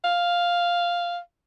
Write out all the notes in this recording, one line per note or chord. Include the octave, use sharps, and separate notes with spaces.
F5